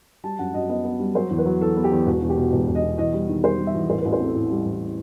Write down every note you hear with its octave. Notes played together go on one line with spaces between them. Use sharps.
G3 A5
F#2 F#5
F#2 D#5
B3 D#5
B3
G3
F#3 C5
E2
B4
F#3
E2 A4
B3
G4
E2
E1 F#4
E2
G4
B2
E1
E1
D#5
B2
E2 D#5
G3
D#3
G3 C5
G3
E5
E2
A1 C5
B4
A1
C5
C4 A4
A2
G3
A1